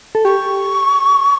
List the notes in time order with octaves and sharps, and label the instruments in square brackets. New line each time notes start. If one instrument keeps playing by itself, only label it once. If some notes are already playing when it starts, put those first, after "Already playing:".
[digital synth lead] A4
[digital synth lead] G4 [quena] C#6